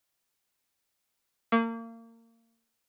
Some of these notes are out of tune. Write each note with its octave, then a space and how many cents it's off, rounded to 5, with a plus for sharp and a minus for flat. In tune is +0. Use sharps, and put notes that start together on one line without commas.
A#3 -30